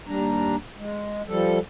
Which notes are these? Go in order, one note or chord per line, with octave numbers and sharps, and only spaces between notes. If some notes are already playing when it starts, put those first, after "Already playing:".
D#2 G3 D4 A#5
G#3
F3 G3 A4